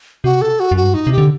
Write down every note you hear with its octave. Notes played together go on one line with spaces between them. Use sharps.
C3 F#4
A4
F#4
F#2 F#4
G2
D#4
C3
G4
D3